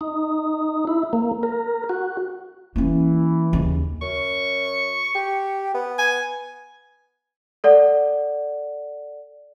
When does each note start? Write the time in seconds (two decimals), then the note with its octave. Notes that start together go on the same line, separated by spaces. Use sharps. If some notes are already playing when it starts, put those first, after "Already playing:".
0.01 D#4
0.87 E4
1.13 A#3
1.43 A#4
1.89 F#4
2.76 E3 A#3 C#4
3.53 D#2 C#3
4.01 F#2 C#6
5.15 G4
5.74 B3
5.98 G#5
7.64 A4 D5 F#5